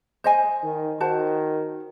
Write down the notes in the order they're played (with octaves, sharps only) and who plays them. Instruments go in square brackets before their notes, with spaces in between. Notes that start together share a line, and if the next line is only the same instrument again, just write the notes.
[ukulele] C5 D#5 G#5
[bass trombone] D#3
[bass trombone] D#3 [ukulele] F#4 C5 A5